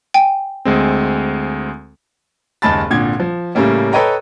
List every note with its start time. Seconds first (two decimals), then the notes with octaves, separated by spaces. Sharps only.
0.14 G5 G#5
0.65 D2 G#3 C4
2.62 F#1 D#2 G#3 A5 B5 A6
2.90 G#1 A#2 D3 G#6
3.20 F3
3.55 A2 C#3 G3 A3 A#3 C#4
3.93 A4 B4 C#5 D#5 G5 A#5